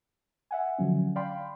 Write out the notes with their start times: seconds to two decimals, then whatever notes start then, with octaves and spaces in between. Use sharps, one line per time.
0.51 E5 F#5 G#5
0.78 D3 F3 F#3 C#4
1.16 D5 F5 G5 B5 C6